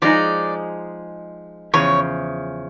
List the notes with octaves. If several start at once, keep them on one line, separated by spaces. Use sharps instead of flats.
F3 G#3 B3 D#4 G#4 D5
E2 C#3 F3 C#5